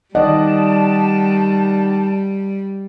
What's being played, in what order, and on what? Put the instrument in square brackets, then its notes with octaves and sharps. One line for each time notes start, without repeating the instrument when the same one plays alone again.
[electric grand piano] D#3 D5 F#5 [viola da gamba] G3 [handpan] D#5 [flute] A5